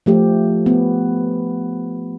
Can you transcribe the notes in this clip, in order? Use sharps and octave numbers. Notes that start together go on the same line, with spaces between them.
F3 A3 G4
B3